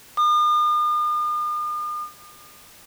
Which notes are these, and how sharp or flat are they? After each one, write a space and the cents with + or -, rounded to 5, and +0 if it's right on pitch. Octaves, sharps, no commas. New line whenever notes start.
D#6 -45